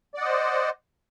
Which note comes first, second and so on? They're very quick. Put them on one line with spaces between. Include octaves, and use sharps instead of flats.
D5 F#5 D#5 C5